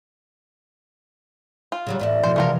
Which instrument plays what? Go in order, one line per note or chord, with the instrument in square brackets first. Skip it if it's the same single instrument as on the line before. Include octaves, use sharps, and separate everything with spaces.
[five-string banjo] F4
[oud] C#3 F#3 G3
[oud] E2 A2 E4 [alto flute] D5
[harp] B2 F3 [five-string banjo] C5
[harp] C3 E3 G#3 [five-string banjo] A3 F4 A#4